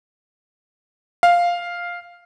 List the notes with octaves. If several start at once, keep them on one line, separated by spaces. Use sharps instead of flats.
F5